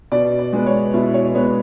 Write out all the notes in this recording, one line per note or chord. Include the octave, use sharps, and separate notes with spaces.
B2 D5
D5
G#3 B3
C#5
B2 E4
C#5
G#3 B3 C#5